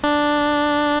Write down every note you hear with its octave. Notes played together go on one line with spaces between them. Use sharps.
D4